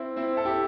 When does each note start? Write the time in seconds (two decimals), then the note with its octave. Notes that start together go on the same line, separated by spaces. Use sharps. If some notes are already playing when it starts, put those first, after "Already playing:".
Already playing: C4 E4
0.16 C4 E4
0.37 A4
0.45 E4 G4